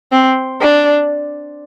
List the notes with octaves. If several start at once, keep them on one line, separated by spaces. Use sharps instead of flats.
C4
D4